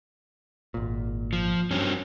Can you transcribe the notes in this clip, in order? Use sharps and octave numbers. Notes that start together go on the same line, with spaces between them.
G#1 A#2
F3
G2 F#3 C4 C#4